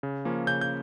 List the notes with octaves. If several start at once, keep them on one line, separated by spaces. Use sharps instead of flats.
C#3
F3 A#3 C#4
C#3 G6
G6